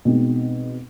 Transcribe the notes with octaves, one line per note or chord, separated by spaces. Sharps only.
B2 G#3 C4 D#4